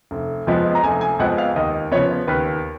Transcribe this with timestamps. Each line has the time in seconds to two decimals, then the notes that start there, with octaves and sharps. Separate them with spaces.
0.11 F1
0.47 F2 F3 G#3 B3
0.75 A#5
0.83 F1 G#5
1.01 G#5
1.19 F2 F3 G#3 B3 F#5
1.38 F5
1.56 D#2 D#5
1.91 C#3 F3 B3 C#5
2.28 D#2 B4